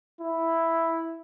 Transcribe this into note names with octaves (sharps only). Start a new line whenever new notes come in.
E4